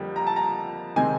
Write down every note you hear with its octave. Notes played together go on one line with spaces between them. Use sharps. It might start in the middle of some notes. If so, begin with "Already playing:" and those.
Already playing: F2 D3 G3 A#3
A#5
A5
A#5
C3 D#3 G#3 C4 G#5